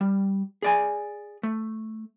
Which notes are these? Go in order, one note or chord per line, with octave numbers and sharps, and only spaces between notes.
G3
G#4 D5 G#5
A3